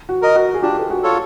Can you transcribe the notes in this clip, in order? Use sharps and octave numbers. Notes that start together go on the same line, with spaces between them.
F#4
A#4 D#5
F#4
G#4
D4 F4 G4
A4
F#4 G#4
F4 A4 C#5